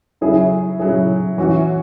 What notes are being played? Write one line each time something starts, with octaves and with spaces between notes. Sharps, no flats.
C#3 F#3 E4 G#4
C#3 F#3 E4 G#4
E3 C#4 F#4